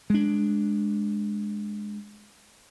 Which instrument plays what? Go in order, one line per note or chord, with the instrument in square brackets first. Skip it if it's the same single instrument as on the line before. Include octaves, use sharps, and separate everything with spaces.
[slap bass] G#3 D4